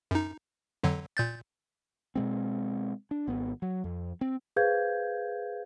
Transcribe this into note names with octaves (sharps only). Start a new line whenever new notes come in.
F#2 D#4
F2 D3 F#3
A#2 G6 A6
B2 G#3 C4
D4
G#1 B3
F#3
F2
C4
G#4 B4 C5 F5 G6 G#6